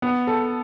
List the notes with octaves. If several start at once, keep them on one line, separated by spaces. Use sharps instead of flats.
B3
A4